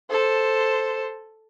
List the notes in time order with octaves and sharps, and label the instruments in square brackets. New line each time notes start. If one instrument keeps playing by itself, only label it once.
[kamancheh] A4 C5